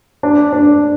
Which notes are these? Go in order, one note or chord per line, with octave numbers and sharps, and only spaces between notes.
D4
D4